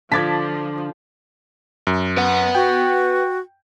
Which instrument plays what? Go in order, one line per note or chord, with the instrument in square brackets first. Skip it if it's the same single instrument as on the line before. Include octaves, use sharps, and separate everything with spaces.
[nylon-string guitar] D3 [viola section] F3 [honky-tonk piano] A5 D6 [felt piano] G#6 A6 B6
[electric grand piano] F#2
[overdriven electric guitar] B4 F#5
[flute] F#4 [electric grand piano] G5